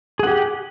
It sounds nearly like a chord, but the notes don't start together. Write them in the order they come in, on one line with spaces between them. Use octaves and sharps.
G#4 F#5 G4